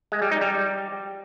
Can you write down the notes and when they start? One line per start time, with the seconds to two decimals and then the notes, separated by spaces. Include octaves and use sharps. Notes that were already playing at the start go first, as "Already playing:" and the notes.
0.12 G#3
0.22 G3
0.31 D#4
0.41 G3